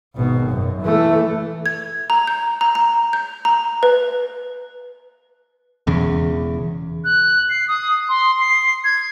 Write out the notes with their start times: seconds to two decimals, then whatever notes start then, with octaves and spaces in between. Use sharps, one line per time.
0.15 G#1 B2
0.49 F#2
0.81 E3 A3
1.66 G#6
2.10 A#5
2.27 G6
2.61 A#5
2.75 A#5
3.13 G6
3.45 A#5
3.83 B4
5.87 E1 E2 C#3
7.04 F#6
7.50 C7
7.68 D#6
8.09 C6
8.40 C7
8.84 G#6